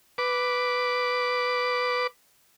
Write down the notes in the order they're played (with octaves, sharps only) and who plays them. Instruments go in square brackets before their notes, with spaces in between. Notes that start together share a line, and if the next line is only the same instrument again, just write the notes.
[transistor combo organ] B4 D6